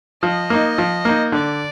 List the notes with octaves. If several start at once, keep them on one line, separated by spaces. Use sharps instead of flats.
F3 D#5
A#3 D#4
F3
A#3 D#4
D3 D5